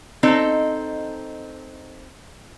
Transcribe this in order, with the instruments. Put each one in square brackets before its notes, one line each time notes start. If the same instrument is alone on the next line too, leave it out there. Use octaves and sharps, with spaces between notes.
[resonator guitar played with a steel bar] C4 D#4 A4